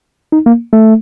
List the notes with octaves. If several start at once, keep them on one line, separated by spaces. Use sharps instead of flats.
D#4
A#3
A3